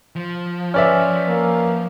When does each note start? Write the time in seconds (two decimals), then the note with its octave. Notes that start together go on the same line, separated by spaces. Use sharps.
0.16 F3
0.74 C#4 B4 D5 E5 G#5 F6
1.28 A#3